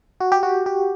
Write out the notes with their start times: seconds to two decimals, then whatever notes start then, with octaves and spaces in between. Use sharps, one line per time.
0.20 F#4
0.32 G4
0.43 F#4
0.66 G4